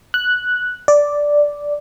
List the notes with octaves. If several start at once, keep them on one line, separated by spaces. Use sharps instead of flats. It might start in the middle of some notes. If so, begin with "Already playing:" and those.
F#6
D5